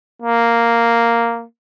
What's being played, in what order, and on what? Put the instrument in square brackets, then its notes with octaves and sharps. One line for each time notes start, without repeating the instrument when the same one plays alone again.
[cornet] A#3